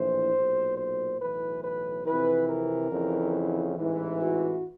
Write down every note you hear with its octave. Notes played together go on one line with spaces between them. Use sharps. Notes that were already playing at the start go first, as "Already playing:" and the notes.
Already playing: A#1 A2 E3 C5
B1 A#2
C5
B1 A2 E3 B4
B4
F2 C3 E3 B4
A#4
F2 C#3 E3
A1 G#2 E3
F#4